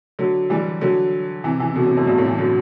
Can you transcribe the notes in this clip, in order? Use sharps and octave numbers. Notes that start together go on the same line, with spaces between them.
D3 F#3
E3 G3
D3 F#3
C3 E3
C3 E3
C3
B2 D3
A2 C3
F#2 A2
G2 B2
A2 C3
C3 E3
D3 F#3